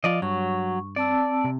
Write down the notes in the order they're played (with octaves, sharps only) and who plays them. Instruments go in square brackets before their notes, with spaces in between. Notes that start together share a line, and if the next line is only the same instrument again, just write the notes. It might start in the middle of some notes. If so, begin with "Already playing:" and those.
[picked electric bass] F3 [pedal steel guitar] F4 D5 D#5
[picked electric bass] G2 [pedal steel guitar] F#3 [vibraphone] C#6
[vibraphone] C4 A5 E6 [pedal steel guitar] D5
[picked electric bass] C3